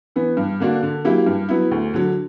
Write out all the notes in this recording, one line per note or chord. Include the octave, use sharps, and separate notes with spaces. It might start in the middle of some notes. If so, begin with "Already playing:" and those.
E3 B3
G2
D3 A#3 D4 F#4
D3
F#3 A#3 E4 G4
G2
F#3 B3 E4
D2
D3 F#3